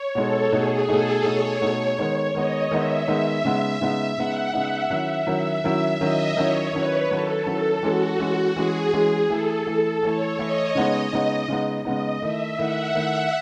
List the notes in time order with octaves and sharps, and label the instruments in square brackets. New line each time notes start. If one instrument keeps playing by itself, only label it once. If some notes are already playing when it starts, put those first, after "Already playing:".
Already playing: [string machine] C#5
[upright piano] B2 G#3 D#4 [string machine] A4
[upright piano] B2 A3 D#4 [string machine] G#4
[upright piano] B2 A3 D#4 [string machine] A4
[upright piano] B2 A3 D#4 [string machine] C#5
[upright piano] B2 A3 D#4
D#3 G#3 B3 D#4
[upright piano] D#3 G#3 B3 D#4 [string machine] D#5
[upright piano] D#3 G#3 B3 D#4 [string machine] E5
[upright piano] D#3 G#3 B3 D#4
C#3 G#3 B3 D#4
[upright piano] C#3 G#3 B3 D#4 [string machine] E5
[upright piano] C#3 G#3 B3 D#4 [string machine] F#5
[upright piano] C#3 G#3 B3 D#4 [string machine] E5
[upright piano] D#3 F#3 C#4 E4 [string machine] E5
[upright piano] D#3 F#3 C#4 E4
D#3 F#3 C#4 E4
[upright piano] D#3 F#3 C#4 E4 [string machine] D#5
[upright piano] D#3 F#3 C#4 E4 [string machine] C#5
[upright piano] D#3 F#3 C#4 E4 [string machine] B4
[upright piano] D#3 F#3 C#4 E4 [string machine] A4
[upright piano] D#3 F#3 C#4 E4 [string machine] A4
[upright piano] E3 G#3 C#4 [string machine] F#4
[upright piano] E3 G#3 C#4
[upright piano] E3 G#3 C#4 [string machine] G#4
[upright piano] E3 G#3 C#4 [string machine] G#4
[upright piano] E3 A3 E4 [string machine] A4
[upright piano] E3 A3 E4 [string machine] A4
[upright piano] E3 A3 E4 [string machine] C#5
[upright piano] E3 A3 E4 [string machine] D#5
[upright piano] C#3 G#3 B3 D#4 [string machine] D#5
[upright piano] C#3 G#3 B3 D#4 [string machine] D#5
[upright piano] C#3 G#3 B3 D#4
[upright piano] C#3 G#3 B3 D#4 [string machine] D#5
[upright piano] D#3 A3 E4 [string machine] E5
[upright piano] D#3 A3 E4 [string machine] F#5
[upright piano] D#3 A3 E4